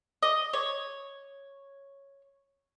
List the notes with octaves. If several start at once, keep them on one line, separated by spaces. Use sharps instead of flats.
D#5
C#5